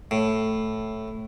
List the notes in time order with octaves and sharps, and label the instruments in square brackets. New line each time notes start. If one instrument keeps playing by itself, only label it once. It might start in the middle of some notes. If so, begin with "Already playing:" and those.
[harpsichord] A2